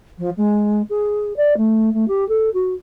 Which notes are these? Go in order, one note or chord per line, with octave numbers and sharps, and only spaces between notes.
F3
G#3
G#4
D5
A3
A3
G4
A4
F#4